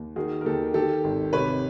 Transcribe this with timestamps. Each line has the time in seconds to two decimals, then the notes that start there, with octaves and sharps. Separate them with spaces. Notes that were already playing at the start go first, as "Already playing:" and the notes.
Already playing: D#2
0.16 D#3 F#4 G#4
0.41 A#4
0.45 D#2 G4 A4
0.74 D#3 G4 A4
1.04 G#1
1.33 C3 B4 C#5